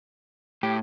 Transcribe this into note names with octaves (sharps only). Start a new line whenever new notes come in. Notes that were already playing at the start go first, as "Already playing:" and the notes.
A2 G4